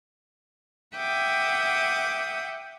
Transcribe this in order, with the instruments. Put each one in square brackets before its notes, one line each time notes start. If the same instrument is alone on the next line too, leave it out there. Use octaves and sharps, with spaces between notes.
[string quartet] E5 F#5 G5 D6 D#6